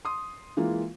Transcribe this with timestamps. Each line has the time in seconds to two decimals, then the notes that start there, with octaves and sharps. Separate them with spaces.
0.05 C6 D#6
0.57 E3 G#3 A#3 F4